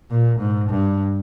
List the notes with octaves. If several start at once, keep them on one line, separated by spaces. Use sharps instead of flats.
A#2
G#2
G2